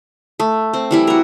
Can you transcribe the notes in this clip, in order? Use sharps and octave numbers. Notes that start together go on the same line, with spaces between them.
A3
C4
E3 G3 E4
F#4 A#4